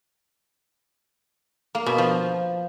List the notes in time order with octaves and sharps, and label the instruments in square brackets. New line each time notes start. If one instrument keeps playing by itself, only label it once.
[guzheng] A#3
B2
F3